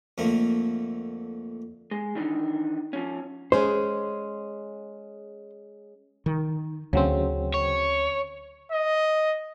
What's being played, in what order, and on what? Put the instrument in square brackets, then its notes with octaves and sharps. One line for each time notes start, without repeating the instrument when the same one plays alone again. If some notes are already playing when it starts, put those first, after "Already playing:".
[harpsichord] F2 D3 A3 A#3
[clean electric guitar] G#3
D#3 E3 D4 D#4
F3 C#4
[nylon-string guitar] G#3 C#4 G#4 [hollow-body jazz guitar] C5
[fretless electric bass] D#3
[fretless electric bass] D2 [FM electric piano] C#3 F#3 C4
[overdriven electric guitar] C#5
[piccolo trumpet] D#5